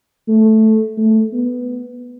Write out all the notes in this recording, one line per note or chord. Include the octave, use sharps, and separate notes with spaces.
A3
A3
B3